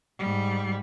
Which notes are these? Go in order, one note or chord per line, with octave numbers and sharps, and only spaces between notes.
G#2 G3